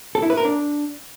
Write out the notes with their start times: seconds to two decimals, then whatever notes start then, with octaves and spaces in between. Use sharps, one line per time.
0.15 A4
0.22 E4
0.30 B4
0.37 A#4
0.45 D4